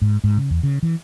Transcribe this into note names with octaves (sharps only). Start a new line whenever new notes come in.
G#2
G#2
C#3
E2
C#3
E3